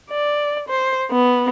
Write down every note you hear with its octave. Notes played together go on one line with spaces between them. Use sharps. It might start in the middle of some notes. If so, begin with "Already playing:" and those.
D5
C5
B3